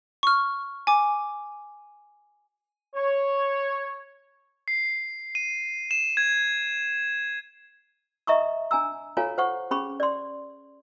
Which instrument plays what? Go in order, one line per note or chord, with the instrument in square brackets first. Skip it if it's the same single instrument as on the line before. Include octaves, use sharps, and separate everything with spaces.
[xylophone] C#6 F6
G#5 D6
[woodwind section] C#5
[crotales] C7
D#7
E7
G#6
[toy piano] D#5 E5 A#5 C#6 D#6
D4 G#5 A#5 E6
F4 A4 C#5 F5 G#5 A#5
C5 F#5 C#6
C#4 G#4 B5 C#6
D5 C6